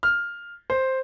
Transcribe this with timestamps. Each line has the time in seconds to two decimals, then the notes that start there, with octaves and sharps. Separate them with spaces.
0.03 F6
0.70 C5